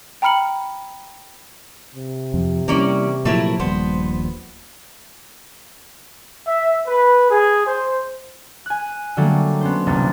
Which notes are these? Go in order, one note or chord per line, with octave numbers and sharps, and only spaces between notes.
G5 A#5 B5 F6 C#7 F#7
C3
F2
E3 G3 A#3 C#4 D5
A#2 F3 F#3 A3 E4 A#4
D#1 A#1 G3 B3 C5
E5
B4
G#4
C5
G#5 F#6
D3 F#3 G3 A3 A#3
B3 C#4 C5
E1 C2 A#3 A6